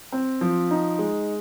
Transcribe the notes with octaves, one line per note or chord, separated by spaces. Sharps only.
C4
F3
D#4
G#3